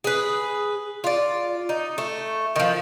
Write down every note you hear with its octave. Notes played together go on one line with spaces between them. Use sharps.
G#4 B4
F4 D5
D#4
A3
D#3 F3